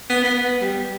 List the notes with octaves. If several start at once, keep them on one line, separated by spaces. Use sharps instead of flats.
B3
B3
G3